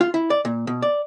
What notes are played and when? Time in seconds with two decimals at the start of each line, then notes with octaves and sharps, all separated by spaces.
0.01 F4
0.14 E4
0.30 D5
0.45 A#2
0.67 B2
0.82 D5